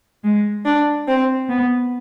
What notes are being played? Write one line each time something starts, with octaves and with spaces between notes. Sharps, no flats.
G#3
D4
C4
B3